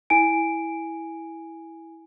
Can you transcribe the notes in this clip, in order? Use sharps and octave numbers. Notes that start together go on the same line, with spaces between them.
E4 G#5 D7